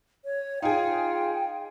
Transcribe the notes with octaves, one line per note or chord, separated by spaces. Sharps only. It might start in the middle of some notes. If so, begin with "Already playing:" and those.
C#5
D#4 F4 G#4 G5